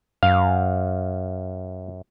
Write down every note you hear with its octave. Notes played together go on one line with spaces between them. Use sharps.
F#2 F5